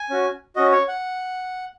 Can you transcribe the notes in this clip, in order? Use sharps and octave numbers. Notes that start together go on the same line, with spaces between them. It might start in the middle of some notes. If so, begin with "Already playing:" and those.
Already playing: G#5
C#4 F#4
C#4 F#4 D#5
C#5
F#5